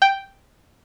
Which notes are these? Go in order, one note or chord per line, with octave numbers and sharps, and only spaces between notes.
G5